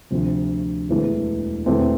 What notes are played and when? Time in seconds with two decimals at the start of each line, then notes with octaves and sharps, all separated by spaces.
0.11 D2 C3 F3
0.89 E1 E2 E3 A3
1.66 E1 E2 E3 A3 C4